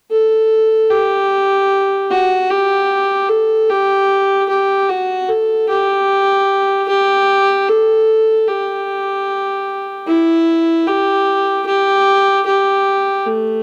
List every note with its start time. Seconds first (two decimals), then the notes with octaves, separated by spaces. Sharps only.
0.11 A4
0.91 G4
2.11 F#4
2.50 G4
3.29 A4
3.70 G4
4.49 G4
4.89 F#4
5.29 A4
5.69 G4
6.89 G4
7.68 A4
8.48 G4
10.07 E4
10.87 G4
11.66 G4
12.46 G4
13.26 A3